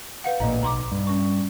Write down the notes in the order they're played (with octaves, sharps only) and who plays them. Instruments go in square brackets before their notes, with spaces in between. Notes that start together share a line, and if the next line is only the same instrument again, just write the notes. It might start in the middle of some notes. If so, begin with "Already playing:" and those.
[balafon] B4 F5 F#5
[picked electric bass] A1 A#2 [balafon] D#5 A#5
[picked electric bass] B1 [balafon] A#5 C6 D6
[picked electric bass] G2
[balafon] C#4 C#6